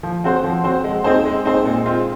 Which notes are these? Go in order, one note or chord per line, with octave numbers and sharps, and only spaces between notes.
F3
C4 F#4 C5
F3
C4 F#4 C5
G#3
C4 D#4 G#4 C5
G#3
C4 D#4 G#4 C5
A#2
G#3 C4 F4